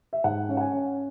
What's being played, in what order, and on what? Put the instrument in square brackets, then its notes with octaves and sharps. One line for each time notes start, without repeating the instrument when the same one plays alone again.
[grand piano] E5
G#2 F#5
C#4
F#5
G#5
C#4